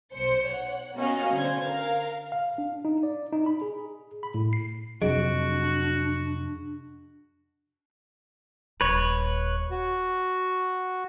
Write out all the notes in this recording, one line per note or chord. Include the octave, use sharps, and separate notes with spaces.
B1 C5 C#7
C#5 F#5
B3 C#4 F#4 A#4 D#5 F5
D3 C5 G#6
A#4 F5
F5
D4
D#4
D5
D#4
B5
G#4
B5
A2
C7
F2 C3 F#3 D4 F#4 G#4 D#5 D7
D#1 B4 C#5
F#4